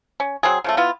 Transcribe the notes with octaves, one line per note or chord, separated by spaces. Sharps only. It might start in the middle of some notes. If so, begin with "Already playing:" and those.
C#4
F#3 C4 G#4
C#3 F3 A3
B3 E4 F4